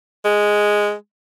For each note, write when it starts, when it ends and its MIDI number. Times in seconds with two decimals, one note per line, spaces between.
0.25 0.93 56